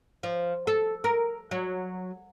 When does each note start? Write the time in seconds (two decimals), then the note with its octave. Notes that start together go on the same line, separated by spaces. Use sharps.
0.23 F3
0.67 A4
1.04 A#4
1.51 F#3